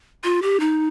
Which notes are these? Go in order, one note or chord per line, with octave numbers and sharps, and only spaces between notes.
F4
G4
D#4